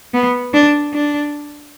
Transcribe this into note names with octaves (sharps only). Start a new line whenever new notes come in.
B3
D4
D4